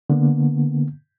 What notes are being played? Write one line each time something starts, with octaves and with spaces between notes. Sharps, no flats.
D3 A#3 B3